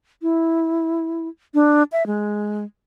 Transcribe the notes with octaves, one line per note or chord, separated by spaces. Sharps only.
E4
D4
E5
G#3